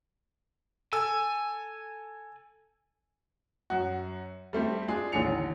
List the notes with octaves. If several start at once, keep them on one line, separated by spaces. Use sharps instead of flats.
A4 G#5 E6
F#2 F#4
G3 A3 C4 G4
G#3 D4 F4 G#4
A1 D#2 D3 G#5 C#7 F7